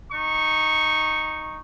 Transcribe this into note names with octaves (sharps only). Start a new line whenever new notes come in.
D#4 C#6